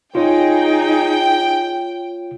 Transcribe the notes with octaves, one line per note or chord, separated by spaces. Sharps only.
D#4 F4 G#4 C#5 G5